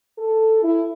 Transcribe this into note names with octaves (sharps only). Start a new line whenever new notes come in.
A4
E4